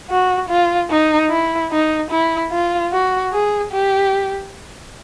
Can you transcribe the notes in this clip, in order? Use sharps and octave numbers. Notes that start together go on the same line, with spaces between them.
F#4
F4
D#4
E4
D#4
E4
F4
F#4
G#4
G4